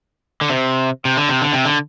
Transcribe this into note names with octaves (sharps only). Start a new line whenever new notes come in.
D3
C3
C3
D3
C3
D3
C3
D3